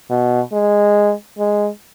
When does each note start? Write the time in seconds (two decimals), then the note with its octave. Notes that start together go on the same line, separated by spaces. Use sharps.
0.10 B2
0.53 G#3
1.39 G#3